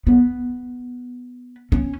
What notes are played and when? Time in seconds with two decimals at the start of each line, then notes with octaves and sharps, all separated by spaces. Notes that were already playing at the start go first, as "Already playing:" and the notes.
0.07 B3
1.72 C#4